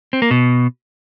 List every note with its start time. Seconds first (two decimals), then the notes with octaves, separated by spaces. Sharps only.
0.13 C4
0.22 A#3
0.31 B2